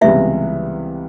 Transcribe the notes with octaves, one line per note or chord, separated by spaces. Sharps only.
C#2 C3 E3 G3 B3 E4 E5